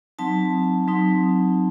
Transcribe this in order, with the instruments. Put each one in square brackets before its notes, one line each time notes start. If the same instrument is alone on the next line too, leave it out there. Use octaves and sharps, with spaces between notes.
[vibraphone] F#3 C4 D#4 A5
F#3 C4 D#4